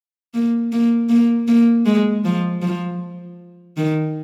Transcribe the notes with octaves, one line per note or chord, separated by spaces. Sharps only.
A#3
A#3
A#3
A#3
G#3
F3
F3
D#3